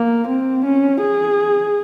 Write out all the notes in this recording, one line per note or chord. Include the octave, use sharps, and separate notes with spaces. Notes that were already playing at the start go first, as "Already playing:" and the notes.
Already playing: A#3
C4
C#4
G#4